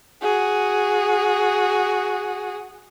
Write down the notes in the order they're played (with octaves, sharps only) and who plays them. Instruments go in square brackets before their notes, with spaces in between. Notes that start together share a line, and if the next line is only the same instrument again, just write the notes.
[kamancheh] F#4 G#4